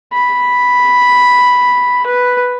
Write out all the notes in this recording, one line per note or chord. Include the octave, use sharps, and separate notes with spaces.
B5
B4